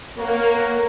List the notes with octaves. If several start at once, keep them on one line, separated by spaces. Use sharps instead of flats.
A#3 A#4 C#5 F#5